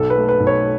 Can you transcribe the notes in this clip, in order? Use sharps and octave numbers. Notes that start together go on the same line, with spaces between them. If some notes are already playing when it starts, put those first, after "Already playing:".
Already playing: B1 A4
B4
A3
B4
B1
C#5